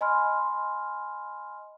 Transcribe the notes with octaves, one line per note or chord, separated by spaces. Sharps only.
D#5 G#5 B5 C6 F6